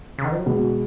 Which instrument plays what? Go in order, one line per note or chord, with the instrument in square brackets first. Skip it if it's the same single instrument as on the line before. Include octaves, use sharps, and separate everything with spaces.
[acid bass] C#3
D#3
F3
F#3
[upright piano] B2 [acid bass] G#3